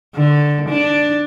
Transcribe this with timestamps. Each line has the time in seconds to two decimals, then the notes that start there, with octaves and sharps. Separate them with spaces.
0.16 D3
0.69 D4